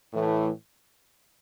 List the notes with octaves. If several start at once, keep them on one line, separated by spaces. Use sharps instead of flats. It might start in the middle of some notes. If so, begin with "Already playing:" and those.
A2 E3 A3